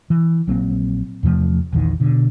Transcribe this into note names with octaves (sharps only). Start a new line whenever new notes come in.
E3
A#1 F#3 A#3 C4
E2 C3 F3 A3
A#1 E2 D#3
B2 D3